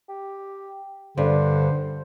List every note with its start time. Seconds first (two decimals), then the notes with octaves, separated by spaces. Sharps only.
0.09 G4
1.18 G2 D3 C5